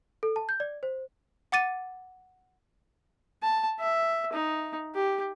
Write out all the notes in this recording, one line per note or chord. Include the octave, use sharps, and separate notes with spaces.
A4
A5
G6
D5
C5
F#5 D6 A6 D#7
A5
E5
D#4
G4